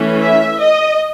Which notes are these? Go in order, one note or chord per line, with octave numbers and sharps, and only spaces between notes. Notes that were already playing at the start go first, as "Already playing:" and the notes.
Already playing: E3 A3 C#4
E5
D#5